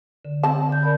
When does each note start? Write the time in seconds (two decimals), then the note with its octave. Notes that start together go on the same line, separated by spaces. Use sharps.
0.25 D3
0.43 C4 A5
0.69 D3 G6
0.82 A#4 D5 B5